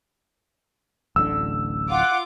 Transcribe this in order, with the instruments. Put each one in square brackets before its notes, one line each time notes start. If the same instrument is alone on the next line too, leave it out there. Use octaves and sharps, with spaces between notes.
[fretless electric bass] D1 A1 D3 [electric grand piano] E6
[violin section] F4 D6 [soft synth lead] F#5